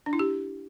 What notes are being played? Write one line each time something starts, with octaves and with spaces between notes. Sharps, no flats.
D4
E4
G4